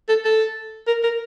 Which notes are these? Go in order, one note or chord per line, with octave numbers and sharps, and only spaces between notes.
A4
A4
A#4
A#4